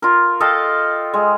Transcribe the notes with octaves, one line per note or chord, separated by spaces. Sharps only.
F4 A#4
A4 D#5 F5 G5
G#3